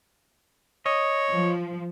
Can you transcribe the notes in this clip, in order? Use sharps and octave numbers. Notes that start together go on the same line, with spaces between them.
C#5 D#5
F3